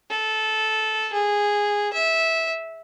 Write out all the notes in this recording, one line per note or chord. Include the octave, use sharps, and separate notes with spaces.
A4
G#4
E5